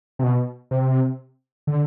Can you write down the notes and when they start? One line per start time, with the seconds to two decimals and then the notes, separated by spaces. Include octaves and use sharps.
0.19 C3
0.23 B2
0.71 C3
1.67 D3